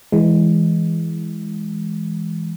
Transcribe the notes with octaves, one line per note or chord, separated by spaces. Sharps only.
E3 G#3